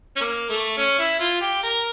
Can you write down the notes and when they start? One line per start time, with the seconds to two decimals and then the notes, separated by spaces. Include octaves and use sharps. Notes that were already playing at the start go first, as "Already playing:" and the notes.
0.16 C#4
0.21 A#3
0.49 A3
0.77 C#4
0.99 E4
1.20 F4
1.41 G4
1.63 A#4